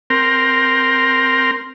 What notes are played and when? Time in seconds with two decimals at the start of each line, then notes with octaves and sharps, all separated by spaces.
0.10 C4 A#4